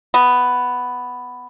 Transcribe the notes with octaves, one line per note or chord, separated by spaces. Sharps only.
B3